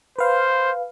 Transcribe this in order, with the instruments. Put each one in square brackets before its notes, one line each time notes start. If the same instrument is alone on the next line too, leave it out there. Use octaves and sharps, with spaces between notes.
[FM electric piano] B4 F5 [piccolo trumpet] C5